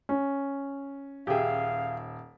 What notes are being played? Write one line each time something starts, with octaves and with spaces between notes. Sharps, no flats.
C#4
D#1 G4 G#4 E5 F5